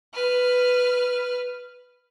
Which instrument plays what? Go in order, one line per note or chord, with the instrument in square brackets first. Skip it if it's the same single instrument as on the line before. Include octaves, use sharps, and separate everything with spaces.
[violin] B4 F6